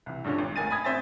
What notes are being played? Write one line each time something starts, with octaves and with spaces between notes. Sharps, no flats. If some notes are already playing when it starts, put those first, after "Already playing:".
C2 E3
G2 A#2 D3 C#4 D4
G#1
A1 A#3 G#5 A6 D#7
G#5 B5 D#6 G#6
A1 C4 C5 E5 A6